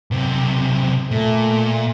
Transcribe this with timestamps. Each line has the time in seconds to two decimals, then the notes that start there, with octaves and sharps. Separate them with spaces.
0.11 B1 C3
1.11 A#2 A3